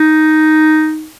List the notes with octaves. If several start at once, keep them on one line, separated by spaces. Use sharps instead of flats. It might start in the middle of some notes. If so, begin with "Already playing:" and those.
Already playing: D#4